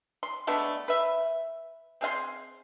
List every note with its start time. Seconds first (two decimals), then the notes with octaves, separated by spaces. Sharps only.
0.23 C6
0.47 G#3 A3 B3 D4
0.88 B4 E5
2.01 C4 G#4 F5 C6